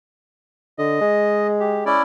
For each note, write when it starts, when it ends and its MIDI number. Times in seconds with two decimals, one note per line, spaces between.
0.78 0.98 50
0.78 1.47 75
1.01 1.97 56
1.60 1.84 67
1.86 2.02 61
1.86 2.02 64
1.86 2.02 74